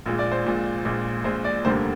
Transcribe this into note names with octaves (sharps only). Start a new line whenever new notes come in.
A#1 A#2 G#3
D5
C5
A#1 A#2 G#3
A#1 A#2 G#3
A#1 A#2 G#3 C5
D5
F1 D#2 D3 G3 A#3 C5